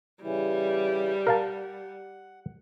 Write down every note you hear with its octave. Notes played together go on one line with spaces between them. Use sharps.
C#3 E3 G3 E4
A#4 F5 F#5 A5